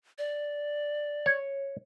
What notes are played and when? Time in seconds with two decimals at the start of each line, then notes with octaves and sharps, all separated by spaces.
0.18 D5
1.26 C#5